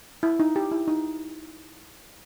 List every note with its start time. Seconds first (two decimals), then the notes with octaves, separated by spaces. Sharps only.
0.23 E4
0.40 D#4
0.56 G4
0.71 E4
0.88 D#4